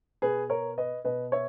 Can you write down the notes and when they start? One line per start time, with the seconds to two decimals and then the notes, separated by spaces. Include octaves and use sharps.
0.22 B2 G#4 B4
0.50 A#4 C#5
0.78 B4 D#5
1.05 B2 B4 D#5
1.32 C#5 E5